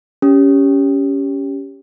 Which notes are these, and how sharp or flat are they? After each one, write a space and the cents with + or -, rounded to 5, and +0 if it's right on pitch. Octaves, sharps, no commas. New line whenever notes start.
C#4 +10 G4 +0